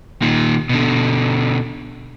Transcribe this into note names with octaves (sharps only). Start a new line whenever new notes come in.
A#2 D#3
B2 D3